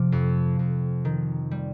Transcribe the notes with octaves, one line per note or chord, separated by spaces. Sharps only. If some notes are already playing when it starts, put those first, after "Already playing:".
Already playing: C3 F3 D6
F2
F2
D#3
G3